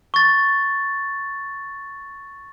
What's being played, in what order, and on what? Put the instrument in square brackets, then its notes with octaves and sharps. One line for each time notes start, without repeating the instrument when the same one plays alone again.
[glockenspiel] C#6 A6